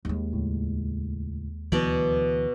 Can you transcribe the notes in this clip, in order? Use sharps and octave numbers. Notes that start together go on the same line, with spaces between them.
D#2 G#3
C#2 A2
D2 B2 E3 F#3 D5